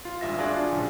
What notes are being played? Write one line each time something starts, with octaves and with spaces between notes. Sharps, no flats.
F4
G#1 G2 E5 F5 A#6
D4 F4 F#4 G#4 D5 G#5
A#1 C#3 F3